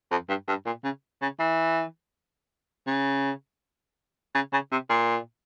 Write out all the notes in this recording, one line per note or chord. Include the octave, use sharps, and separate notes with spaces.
F2
G2
G2
A#2
C#3
C#3
E3
C#3
C#3
C#3
C3
A#2